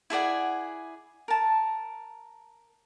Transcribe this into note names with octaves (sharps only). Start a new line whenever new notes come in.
E4 G#4 D5 F#5
A#4 A5